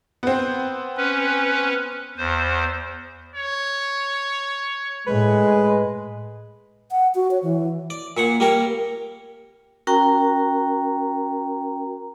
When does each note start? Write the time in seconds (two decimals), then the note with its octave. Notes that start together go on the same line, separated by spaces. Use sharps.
0.23 B3 C4
0.97 C#4 B4
2.18 E2 C5
3.35 C#5
5.07 A2 G#3 B4
6.91 F#5
7.15 F#4
7.31 C#5
7.43 E3
7.90 D5
8.17 A#2 C#5 F#5
8.40 G3 A#3 A#4 C#5
9.87 C#4 F#4 A#4 G5 A#5